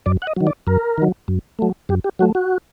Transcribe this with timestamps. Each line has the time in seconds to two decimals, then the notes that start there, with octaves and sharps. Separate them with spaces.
0.06 F#2 D5
0.22 F#5
0.27 D#5
0.36 D#3 F#3
0.47 D5
0.67 F#2 A#4
0.98 D#3 F#3
1.28 F#2
1.59 F#3 A3
1.89 F#2 G4
2.04 G4
2.19 F#3 A3 F#4
2.35 F#4